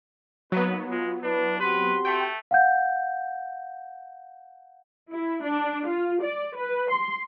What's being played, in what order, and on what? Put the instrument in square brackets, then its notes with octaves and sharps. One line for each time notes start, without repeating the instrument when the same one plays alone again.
[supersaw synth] F#3 B3 [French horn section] A#3 D#4 [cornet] B4
[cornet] G#3 [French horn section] F4
[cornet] D4 [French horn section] E4 B4
[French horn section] C4 F#4 G4 [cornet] B4 [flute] C6
[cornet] A3 [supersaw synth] G5
[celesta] F5 F#5 G6
[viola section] E4
D4
F4
D5
B4
C6